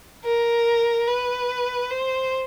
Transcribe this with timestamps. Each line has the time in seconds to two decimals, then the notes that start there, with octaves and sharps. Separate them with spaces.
0.25 A#4
1.08 B4
1.90 C5